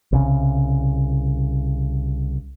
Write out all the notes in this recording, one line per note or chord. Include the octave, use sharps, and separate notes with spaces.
C2 C#3